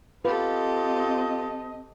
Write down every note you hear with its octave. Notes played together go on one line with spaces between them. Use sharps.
C4 F4 G4 A4 B4 D#5